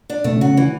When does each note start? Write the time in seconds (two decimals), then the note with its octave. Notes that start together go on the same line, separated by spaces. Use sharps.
0.10 D4
0.24 B2 A3 B3
0.37 C#3 C#4
0.41 F#4
0.48 C#3 C#4
0.57 D3 E3